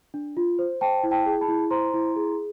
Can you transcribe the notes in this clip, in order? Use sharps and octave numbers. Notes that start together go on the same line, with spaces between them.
D4
F4
C5
C5 G5 A5
E4
G5 A5
G#4
A5 B5
E4
C5 A#5 C6
E4
G#4